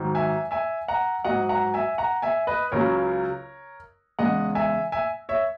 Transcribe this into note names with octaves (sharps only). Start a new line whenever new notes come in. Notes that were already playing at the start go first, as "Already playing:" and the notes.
Already playing: G#2 D#3 F#3
E5 G#5
E5 G#5
F#5 A#5
G#2 F#3 D#5 F#5
F#5 A#5
E5 G#5
F#5 A#5
E5 G#5
B4 D#5
C#2 C#3 F#3 A#4 C#5
E2 C#3 G#3 D#5 F#5
E5 G#5
E5 G#5
C#5 E5